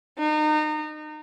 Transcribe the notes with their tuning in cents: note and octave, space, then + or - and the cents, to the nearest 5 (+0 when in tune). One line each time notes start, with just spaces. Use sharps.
D#4 -30